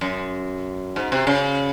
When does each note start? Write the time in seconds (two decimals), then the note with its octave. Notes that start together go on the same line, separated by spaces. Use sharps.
0.01 F#2
0.96 G#2
1.12 C3
1.27 C#3